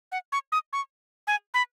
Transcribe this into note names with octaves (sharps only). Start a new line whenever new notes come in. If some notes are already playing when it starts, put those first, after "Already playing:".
F#5
C#6
D#6
C#6
G#5
B5